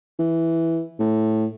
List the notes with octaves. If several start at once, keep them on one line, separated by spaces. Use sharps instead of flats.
E3
A2